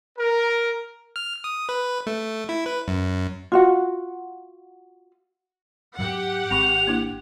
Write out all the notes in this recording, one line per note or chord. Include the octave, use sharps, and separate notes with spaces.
A#4
F6
D#6
B4
A3
E4
B4
F#2
F4 F#4 F#5
G#2 F#3 G4 F#5
G#1 G#3 C4 B5 C#6 F7
A#3 D4 E4